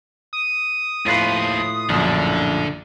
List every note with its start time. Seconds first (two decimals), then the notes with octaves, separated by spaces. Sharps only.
0.33 D#6
1.06 D#2 A2 F3 F4 B4
1.90 A#1 F#2 D3